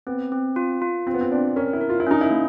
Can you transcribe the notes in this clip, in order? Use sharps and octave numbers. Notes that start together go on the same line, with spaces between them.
B3 C4
C4
F4
F4
C4 F4
B3
C4
C4 D4
C#4 A#4
E4
A#4
F4
E4
C#4 D#4
E4
A#3